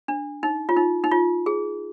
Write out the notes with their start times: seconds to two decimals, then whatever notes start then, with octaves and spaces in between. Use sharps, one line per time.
0.08 D4
0.43 D#4
0.69 F4
0.76 D#4
1.04 D#4
1.11 F4
1.46 G#4